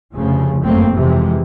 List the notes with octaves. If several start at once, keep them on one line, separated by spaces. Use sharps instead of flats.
F1 D2 C#3 F3
G1 F#2 A3 A#3 C4
F2 C3 E3 G#3